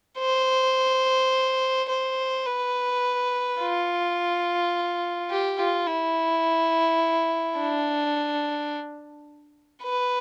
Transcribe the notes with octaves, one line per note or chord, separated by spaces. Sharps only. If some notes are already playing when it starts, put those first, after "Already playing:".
C5
C5
B4
F4
G4
F4
E4
D4
B4